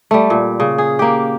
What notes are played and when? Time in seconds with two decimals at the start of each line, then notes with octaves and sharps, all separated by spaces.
0.11 G3 A3
0.30 A#2
0.60 C#3
0.78 G#4
0.99 A#3 G4